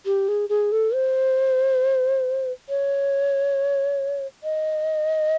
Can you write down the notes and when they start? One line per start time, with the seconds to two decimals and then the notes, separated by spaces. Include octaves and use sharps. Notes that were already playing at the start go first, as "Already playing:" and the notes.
0.06 G4
0.28 G#4
0.49 G#4
0.72 A4
0.94 C5
2.69 C#5
4.44 D#5